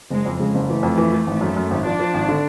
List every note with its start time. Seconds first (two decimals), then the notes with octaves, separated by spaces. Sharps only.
0.10 F#1 G#3
0.26 F2
0.40 C#3 G#3
0.54 F#1
0.68 E3 A3
0.83 F2
0.98 E3
1.13 E3
1.27 G#1
1.41 F#2
1.56 F#2
1.71 G#1
1.85 F3 D4
2.00 F3
2.14 G#1
2.29 D3